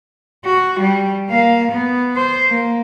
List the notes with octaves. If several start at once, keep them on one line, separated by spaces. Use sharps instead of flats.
F#4
G3
A#3 F5
B3
C5
A#3